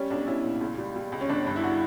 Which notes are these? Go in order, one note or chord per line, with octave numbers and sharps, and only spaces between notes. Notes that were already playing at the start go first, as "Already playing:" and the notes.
Already playing: G3 C#4
B1 D4
B1 C#4 E4
A#2
C#2
G3
G3
C#2
C#4
G1 D4
G2
E4
D4 F#4